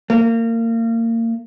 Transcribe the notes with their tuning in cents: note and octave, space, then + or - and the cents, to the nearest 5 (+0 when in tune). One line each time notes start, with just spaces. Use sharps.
A#3 -30